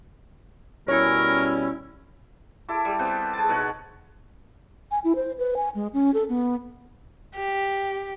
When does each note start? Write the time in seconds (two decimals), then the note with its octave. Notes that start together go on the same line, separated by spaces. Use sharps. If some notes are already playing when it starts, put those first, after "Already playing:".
0.88 B2 G3 C#4 E4 A#4 C#5
2.69 E4 A4 D6
2.85 G3
2.99 B3 C4 C5
3.33 G#4 A5
3.49 B2 D#4 C#5 F#5
4.91 G#5
5.04 E4
5.16 C5
5.38 B4
5.57 G#5
5.75 G#3
5.94 C#4
6.14 A4
6.29 B3
7.36 G4